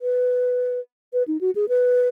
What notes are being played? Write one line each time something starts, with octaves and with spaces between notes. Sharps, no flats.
B4
B4
D#4
F#4
G#4
B4